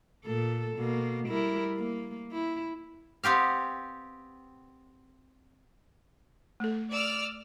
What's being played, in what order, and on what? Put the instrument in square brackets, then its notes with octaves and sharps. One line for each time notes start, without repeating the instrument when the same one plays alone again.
[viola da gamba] A#2 A4
B2 A#3
G3 E4 A#4
A#3
E4
[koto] B3 C4 G4 F5
[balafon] A3 A4
[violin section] D5 E6 F6